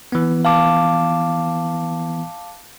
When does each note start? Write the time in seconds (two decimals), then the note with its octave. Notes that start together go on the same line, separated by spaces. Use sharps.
0.12 E3 B3
0.45 F5 A5 D6